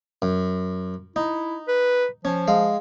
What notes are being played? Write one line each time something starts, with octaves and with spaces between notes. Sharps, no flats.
F#2
D#4 E4
B4
F3 C#4
G#3 F5